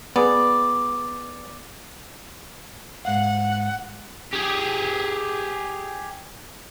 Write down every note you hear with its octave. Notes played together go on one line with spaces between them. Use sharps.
B3 G#4 D5
G#2 F5 F#5
G4 G#4